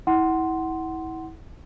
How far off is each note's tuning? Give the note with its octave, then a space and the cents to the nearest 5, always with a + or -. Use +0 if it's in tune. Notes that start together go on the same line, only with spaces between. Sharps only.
E4 -30 F#5 +15 C6 +0